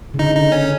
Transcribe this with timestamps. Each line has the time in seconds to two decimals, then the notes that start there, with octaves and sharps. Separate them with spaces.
0.14 C#3
0.19 D3 D#4
0.35 D#4
0.52 C#4